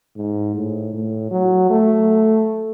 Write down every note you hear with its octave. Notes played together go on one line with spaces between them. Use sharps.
G#2
A2
A2
F#3
A3